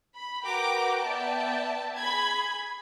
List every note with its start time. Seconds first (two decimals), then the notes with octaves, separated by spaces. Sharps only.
0.14 B5
0.44 F#4 A#4 B4 G5 A#5 D6
1.03 B3 D5 E5 G5 A5
1.95 G#4 B5 G#6